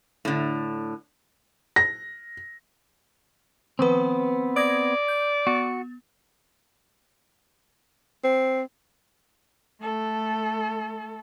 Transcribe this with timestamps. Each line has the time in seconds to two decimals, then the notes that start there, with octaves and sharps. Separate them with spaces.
0.25 A2 D3
1.76 A#6
3.79 D#3 F3 B3 C4 B4
4.56 D5 D#6 G#6 A#6
5.08 G6
5.47 B3 F#4
8.24 C4
9.82 A3 A4